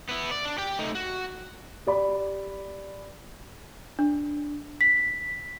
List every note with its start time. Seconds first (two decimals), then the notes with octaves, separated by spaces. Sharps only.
0.09 B3 E4
0.31 D5
0.45 D4
0.58 G4 G5
0.79 A3 D#4
0.95 F#4
1.87 G4 D5 B5
3.99 D4
4.81 B6